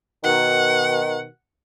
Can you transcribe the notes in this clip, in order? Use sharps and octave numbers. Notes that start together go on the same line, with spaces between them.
B2 D#3 F#5